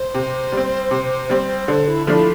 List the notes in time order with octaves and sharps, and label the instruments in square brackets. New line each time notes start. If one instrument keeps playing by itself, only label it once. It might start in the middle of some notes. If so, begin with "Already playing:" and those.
Already playing: [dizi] C5
[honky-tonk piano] C3
G3 C4
C3
G3 C4
[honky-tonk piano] D3 [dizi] D5
[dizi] C5
E4
[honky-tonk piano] F3 A3 D4 [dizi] E4 F4